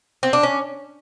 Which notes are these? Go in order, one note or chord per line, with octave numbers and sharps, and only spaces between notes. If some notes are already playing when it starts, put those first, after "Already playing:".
C4
D4
C#4